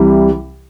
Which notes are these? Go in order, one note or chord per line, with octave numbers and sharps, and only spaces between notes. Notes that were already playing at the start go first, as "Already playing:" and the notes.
Already playing: C2 C3 E3 G3